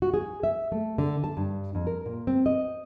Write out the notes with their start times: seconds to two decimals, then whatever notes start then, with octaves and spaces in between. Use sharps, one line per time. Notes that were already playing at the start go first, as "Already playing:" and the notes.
0.02 F#4
0.14 G#4
0.43 E5
0.72 A3
0.98 D3
1.24 A5
1.37 G2
1.75 F2
1.87 A#4
2.06 A#2
2.27 C4
2.46 D#5